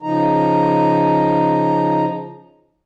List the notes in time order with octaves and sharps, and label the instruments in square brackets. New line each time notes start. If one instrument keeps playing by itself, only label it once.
[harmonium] C#3 F3 D#4 A#5